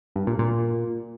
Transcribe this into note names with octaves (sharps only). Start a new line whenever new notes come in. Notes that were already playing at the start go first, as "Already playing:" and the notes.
G2
A#2
A#2